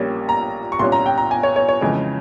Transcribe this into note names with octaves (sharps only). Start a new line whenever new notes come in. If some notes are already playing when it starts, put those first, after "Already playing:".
Already playing: A#1 A#2 G3 A#3 C#4
A#5
C#6
C2 A#2 G3 C#4 C6
A#5
G5
A#5
G#5
C#5
C#5
C#5
F2 C#3 E3 G#3